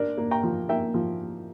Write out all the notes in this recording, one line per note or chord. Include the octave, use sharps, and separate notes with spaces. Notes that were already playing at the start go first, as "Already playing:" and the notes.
Already playing: D4 A#4 D5
A#3
G5 A#5
F3
A#3 E5 G5
F3